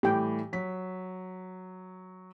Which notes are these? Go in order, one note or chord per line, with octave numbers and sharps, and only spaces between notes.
A2 E3 G3 G4 G5
F#3 B6